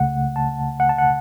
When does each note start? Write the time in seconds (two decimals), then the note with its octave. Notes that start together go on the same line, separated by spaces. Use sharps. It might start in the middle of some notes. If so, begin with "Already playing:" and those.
Already playing: C#2 C#3 A3 F#5
0.36 A5
0.80 F#5
0.89 A5
0.98 F#5